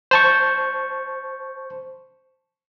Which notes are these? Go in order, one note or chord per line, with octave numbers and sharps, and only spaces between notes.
C5 A5 C#6